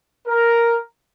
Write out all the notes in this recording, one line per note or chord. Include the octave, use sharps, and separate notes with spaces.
A#4